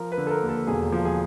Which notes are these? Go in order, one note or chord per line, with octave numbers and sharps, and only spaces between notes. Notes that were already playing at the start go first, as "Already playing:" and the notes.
Already playing: F3 A#4
B4
D3
A4
A#4
D#2
A4
E1 G#4
F3
G#4